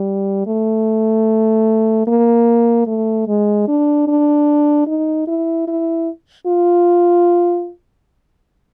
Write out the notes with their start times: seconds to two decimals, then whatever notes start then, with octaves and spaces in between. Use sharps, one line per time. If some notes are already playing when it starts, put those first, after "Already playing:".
Already playing: G3
0.47 A3
2.08 A#3
2.87 A3
3.28 G#3
3.68 D4
4.08 D4
4.87 D#4
5.28 E4
5.68 E4
6.47 F4